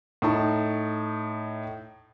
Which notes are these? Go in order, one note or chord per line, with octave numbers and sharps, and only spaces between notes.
A2 D#4 A5